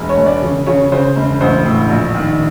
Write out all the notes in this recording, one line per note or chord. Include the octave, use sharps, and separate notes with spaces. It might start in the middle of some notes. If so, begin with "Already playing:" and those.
Already playing: E1
C#5
E1
D5
C#3
C#3 C#5
C#3 C5
E1
A1 C5
A2
A#1
D#3